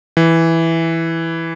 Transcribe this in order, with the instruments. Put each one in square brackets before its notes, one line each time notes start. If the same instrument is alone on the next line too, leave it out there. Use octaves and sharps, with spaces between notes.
[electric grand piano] E3